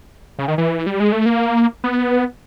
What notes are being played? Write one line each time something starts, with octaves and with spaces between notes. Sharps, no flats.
C#3
D#3
E3
G3
G#3
A3
A#3
B3